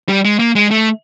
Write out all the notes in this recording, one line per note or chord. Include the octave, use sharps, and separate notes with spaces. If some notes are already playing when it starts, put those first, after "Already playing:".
G3
G#3
A#3
G#3
A3